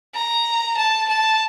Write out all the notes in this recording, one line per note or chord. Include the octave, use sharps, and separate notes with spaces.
A#5
A5
A5